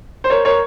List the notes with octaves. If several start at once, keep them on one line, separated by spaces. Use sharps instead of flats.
C5
A#4 C#5
A#4 C#5